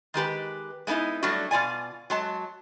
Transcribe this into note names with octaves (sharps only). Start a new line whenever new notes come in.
D#3 G#3 G4 B4
G#3 A3 B3 D#4 E4
F#3 G3 A3 D4 F#4
B2 F4 D5 G#5
F#3 G#3 A5